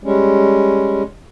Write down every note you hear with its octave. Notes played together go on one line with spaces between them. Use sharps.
G3 G#3 C#4